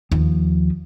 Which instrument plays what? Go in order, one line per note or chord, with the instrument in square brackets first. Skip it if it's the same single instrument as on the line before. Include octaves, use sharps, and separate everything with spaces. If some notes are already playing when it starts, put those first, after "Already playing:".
[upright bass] D#2 F3